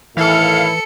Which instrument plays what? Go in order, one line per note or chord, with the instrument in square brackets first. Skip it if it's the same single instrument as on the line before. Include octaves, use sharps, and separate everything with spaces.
[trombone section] A2 D#3 E4 [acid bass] E3 [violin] A4 C#7 [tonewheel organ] F5